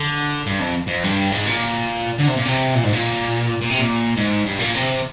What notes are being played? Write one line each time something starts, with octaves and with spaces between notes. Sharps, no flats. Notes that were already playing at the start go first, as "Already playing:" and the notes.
Already playing: D3
G2
F2
F2
G2
G#2
A#2
D3
C3
A#2
C3
A#2
G#2
A#2
A#2
C3
A#2
G#2
G2
A#2
C3